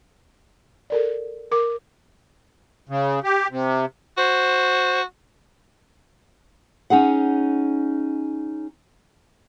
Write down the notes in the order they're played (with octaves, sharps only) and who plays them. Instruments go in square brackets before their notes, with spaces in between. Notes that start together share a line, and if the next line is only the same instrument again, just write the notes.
[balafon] A4 A#4 D5
A#4 D6
[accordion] C#3
G4
C3
[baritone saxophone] F#4 [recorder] C5
[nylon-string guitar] C#4 D#4 G#4 F#5